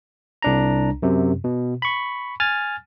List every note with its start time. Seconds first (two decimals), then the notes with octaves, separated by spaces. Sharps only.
0.42 C2 D4 A#5
1.02 F#2 C3
1.44 B2
1.82 B5 C#6
2.40 G#5 F6 A6